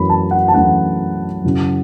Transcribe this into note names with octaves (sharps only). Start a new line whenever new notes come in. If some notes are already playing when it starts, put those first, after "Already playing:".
Already playing: F#2 E3 A3 C#4 B5
A5
F#5
A5
F#2 E3 A3 C#4 F#5
F#2 C#3 F#3 C#4 E4